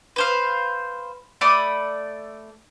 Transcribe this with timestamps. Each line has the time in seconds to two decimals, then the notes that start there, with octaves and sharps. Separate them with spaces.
0.16 B4 C5 F5
1.41 A3 D5 B5 D#6